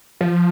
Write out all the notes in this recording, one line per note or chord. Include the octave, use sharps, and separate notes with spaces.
F3